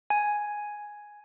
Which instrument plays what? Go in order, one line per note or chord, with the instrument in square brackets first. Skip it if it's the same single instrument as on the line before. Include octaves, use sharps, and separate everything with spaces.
[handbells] G#5